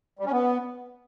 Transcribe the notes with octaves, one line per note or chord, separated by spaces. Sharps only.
G3
C#4
B3